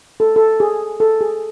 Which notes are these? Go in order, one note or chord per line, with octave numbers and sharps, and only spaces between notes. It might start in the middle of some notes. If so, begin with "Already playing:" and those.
A4
A4
G#4
A4
G#4